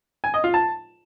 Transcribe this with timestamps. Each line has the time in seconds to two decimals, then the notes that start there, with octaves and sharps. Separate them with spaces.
0.24 G#5
0.34 D#5
0.44 F4
0.54 A5